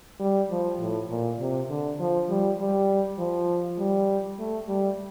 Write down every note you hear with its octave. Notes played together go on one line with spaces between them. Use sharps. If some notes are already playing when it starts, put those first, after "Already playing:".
G3
F3
A2
A#2
C3
D3
F3
G3
G3
F3
G3
A3
G3